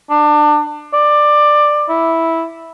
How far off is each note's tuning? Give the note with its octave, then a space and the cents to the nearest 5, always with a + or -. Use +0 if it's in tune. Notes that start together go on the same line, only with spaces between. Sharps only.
D4 +25
D5 +15
E4 -5